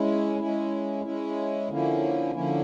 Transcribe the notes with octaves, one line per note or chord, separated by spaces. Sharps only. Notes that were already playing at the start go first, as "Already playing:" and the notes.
Already playing: G#3 C#4 E4
G#3 C#4 E4
G#3 C#4 E4
D3 F3 A#3 C#4 E4
D3 F3 A#3 C#4 E4